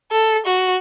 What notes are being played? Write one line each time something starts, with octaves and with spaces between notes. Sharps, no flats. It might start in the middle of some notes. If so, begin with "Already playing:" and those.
A4
F#4